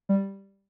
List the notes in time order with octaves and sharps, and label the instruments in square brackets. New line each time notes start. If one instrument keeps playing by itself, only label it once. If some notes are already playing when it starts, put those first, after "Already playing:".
[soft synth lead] G3